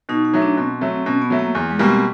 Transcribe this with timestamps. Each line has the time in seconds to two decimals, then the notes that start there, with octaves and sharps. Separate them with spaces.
0.09 B2 D#4
0.25 D#4
0.34 F#3 A3
0.42 D4
0.57 B2 C4
0.81 F#3 A3
1.06 B2 C#4
1.22 B3
1.30 F#3 A3
1.39 A#3
1.55 E2
1.71 G#3
1.79 B2 G3 A#3
1.87 C4